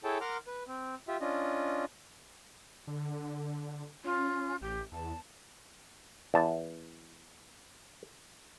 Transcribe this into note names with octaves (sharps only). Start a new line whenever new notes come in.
E4 G#4 A4 C#5 G5 A5
A#4 F#5 A#5 C6 D6 F6
B4
C4
F4 G4 E5
C#4 D4 F4 D#5
D3
C#4 F4
A1 G4
E2 A5
E2 A5